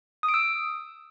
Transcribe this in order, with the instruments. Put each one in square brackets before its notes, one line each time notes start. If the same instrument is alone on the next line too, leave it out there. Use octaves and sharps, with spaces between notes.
[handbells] D#6
D7
E6